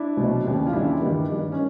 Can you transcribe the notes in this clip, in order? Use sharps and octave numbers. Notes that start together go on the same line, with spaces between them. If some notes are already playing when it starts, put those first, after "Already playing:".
Already playing: D4 E4
C2 B2 F#3
D#2 C#3 E3 G3
F4
D#2 C#3 E3 G3 D4 E4
G2 D#3 G3
G2 D#3 G3
C#4